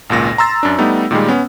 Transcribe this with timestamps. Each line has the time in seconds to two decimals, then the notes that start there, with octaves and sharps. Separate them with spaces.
0.10 G#1 C#2 A#2 A#6
0.38 A#5 C6 E6 A6
0.63 F#2 D4
0.78 G3 A3 B3 D#4
1.11 A#2 D#3 G3 G#3
1.28 B3 C#4